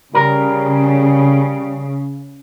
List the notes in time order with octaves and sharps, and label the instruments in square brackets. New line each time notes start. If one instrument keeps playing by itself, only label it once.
[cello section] C#3 [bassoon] G3 [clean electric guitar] A#4